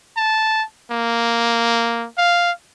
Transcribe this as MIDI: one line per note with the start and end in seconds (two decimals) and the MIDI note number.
0.17 0.64 81
0.91 2.07 58
2.18 2.51 77